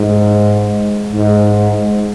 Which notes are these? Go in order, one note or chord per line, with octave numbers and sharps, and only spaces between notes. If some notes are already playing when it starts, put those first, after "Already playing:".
Already playing: G#2
G#2